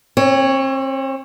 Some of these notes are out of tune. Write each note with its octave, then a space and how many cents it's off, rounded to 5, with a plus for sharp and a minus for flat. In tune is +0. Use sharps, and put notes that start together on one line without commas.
C4 +40 C#5 +0